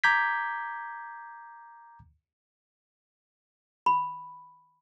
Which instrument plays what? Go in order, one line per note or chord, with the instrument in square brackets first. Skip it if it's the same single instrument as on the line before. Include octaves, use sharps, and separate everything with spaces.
[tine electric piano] A#5 D6 G6 G#6 B6
[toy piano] B5